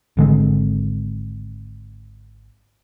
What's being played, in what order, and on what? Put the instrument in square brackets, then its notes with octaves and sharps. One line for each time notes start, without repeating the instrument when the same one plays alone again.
[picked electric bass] G#1 D3 G#3 C4